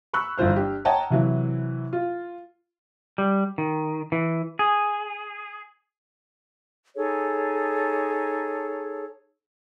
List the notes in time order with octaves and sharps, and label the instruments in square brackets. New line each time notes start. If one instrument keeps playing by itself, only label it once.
[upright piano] B5 C#6 E6 F#6
G1 E3 F4 C5 F6
D4 G4
C#5 D#5 F#5 G5 A5 A#5
C3 E3 F#3 E4
F4
[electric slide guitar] G3
D#3
E3
G#4
[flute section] D#4 G#4 A4 C#5